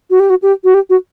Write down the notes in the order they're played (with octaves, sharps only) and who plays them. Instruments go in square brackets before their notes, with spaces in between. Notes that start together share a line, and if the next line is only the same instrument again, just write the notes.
[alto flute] F#4
G4
F#4
G4
F#4
G4
F#4